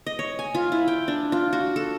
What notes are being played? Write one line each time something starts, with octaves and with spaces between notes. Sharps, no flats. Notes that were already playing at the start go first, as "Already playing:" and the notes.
D#5
C#5
G#5
F4
E4
G5
D4
F4
F#4
A4